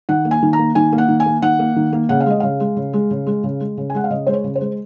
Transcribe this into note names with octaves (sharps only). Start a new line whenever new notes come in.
D#3 F#5
A#3
G#5
D#3
A#5
A#3
D#3 G#5
A#3
F#5
D#3
G#5
A#3
D#3 F#5
A#3
D#3
A#3
C#3 F#5
F5
G#3 D#5
C#3 F5
G#3
C#3
G#3
C#3
G#3
C#3
G#3
C#3
G#5
G#3 F#5
F5
C#3 D#5
G#3 C5
C#5
C#3
C5
G#3